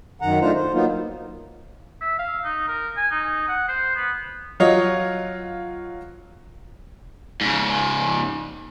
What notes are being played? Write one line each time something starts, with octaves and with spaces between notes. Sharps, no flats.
F#2 D#3 F#5 A#5
A3 D4 D#4 F4 C5 A#5
C5
F#3 A#3 B3 D#4 F4
E5
F5
D#4
A#4
G#5
D#4
F#5
C5
B3
F#3 F4 C#5 D#5
G#2 C#3